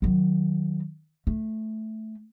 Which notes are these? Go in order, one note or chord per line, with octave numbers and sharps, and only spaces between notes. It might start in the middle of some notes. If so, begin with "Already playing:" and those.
D#3 F#3
A3